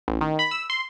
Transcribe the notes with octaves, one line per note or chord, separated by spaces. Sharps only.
A1
D#3
B5
E6
C6